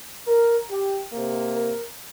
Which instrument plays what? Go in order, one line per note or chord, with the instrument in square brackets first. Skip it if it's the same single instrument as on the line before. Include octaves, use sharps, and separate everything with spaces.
[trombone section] A#4
G4
C3 A#3
A#4